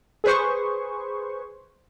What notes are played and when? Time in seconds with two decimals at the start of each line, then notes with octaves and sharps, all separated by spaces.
0.24 G#4 B4 C5 C#6